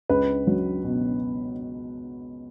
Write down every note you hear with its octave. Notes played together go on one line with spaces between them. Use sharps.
C#2 B4
F#3
B2